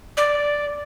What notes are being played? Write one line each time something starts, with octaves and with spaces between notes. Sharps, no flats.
D5